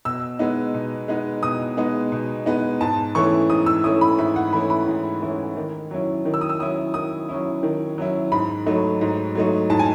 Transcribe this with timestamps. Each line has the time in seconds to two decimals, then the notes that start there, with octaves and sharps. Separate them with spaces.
0.05 B2 E6
0.39 G#3 B3 D#4
0.74 B2
1.08 G#3 B3 D#4
1.43 B2 D#6
1.77 G#3 B3 D#4
2.12 B2
2.46 G#3 B3 D#4
2.81 G#2 A5
3.15 E3 A3 C#4 E4 C#6
3.50 G#2 D#6
3.66 E6
3.84 E3 A3 C#4 E4 D#6
4.01 B5
4.18 G#2 E5
4.36 F#5
4.53 E3 A3 C#4 E4 B5
4.70 B5
4.88 G#2
5.22 E3 A3 C#4 E4
5.57 D#3
5.91 F#3 C#4 E4
6.25 D#3
6.34 E6
6.41 D#6
6.49 E6
6.59 F#3 C#4 E4 D#6
6.94 D#3 D#6
7.29 F#3 C#4 E4
7.63 D#3
7.98 F#3 C#4 E4
8.32 G#2 B5
8.66 F#3 A3 D#4
9.01 G#2
9.35 F#3 A3 D#4
9.70 G#2 A5
9.79 G#5